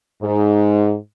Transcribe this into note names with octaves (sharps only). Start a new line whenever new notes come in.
G#2